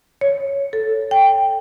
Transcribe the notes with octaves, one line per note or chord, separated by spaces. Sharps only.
C#5
A4
G5